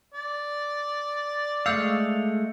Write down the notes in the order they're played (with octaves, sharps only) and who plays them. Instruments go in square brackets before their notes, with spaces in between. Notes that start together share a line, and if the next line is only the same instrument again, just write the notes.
[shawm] D5
[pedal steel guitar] G#3 A3 F5 [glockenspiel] E6 G6 C#7